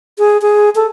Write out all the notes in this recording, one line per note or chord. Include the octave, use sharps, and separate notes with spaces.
G#4
G#4
A4